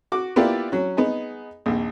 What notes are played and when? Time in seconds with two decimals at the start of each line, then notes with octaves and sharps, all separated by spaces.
0.12 F#4 D6
0.36 A#3 B3 E4 F4 G4 D5
0.72 F#3 C#4
0.97 B3 D#4 G#4
1.66 A#1 D#2